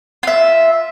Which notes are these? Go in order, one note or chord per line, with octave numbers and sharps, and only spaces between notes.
F4 E5